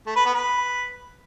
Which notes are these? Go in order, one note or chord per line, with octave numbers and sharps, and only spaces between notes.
A3
B4
B3
B4